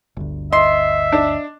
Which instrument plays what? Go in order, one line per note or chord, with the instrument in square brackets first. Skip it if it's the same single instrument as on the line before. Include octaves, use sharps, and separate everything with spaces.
[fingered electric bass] G1 D2
[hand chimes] D#5 C7 [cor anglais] E5 [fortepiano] C6
[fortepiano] D4